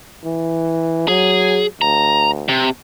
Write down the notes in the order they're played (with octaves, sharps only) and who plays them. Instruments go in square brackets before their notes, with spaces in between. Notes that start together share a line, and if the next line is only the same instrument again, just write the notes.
[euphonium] E3
[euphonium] F#3 [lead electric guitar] G#4
[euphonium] D2 [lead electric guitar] A#5
[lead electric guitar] C3